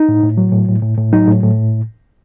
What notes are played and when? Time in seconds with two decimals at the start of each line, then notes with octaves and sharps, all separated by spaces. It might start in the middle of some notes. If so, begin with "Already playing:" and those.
Already playing: D#4
0.08 A2
0.23 A2
0.37 F#3
0.52 A2
0.68 A2
0.82 A2
0.98 A2
1.13 F#3 D#4
1.28 A2
1.43 A2